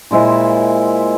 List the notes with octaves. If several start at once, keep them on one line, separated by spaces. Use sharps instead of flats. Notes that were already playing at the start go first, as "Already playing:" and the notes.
A#2 G#3 E4 C5